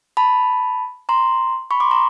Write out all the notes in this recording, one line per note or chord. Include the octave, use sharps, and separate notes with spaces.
A5 B5
A#5 C6
B5 C#6
C6 D6
A#5 C6